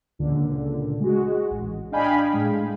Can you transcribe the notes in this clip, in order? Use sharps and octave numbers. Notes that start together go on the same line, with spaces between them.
C#2 A#2 D3
G#3 F#4
A1
D4 D#5 F5 G5 G#5 B5
A2 G#3